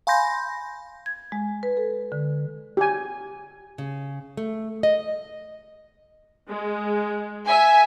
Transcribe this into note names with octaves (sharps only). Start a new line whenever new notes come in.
F5 G#5 B5 C6 G6 A#6
G#6
G#3
B4
A4
D3
G4 G#5
C#3
A3
D#5
G#3
E5 G#5